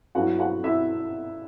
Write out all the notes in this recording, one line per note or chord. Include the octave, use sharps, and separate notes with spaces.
G2 F#3 B3 E4 F#4 F#5
F#4 F#5
E4 E5